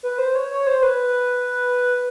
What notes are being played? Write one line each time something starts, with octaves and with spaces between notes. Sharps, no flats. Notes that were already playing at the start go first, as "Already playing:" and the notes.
B4
C5
C#5
C#5
C5
B4